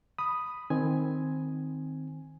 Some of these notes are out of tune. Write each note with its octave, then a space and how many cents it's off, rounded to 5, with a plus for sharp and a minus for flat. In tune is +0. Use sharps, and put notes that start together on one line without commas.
B5 +0 D#6 +0
D#3 +0 C4 +0 G#5 +0